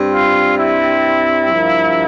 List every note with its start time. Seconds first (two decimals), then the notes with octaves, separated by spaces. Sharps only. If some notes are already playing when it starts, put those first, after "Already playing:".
Already playing: G2 G3 C4
0.13 F4
0.58 E4
1.49 G2 F3 A#3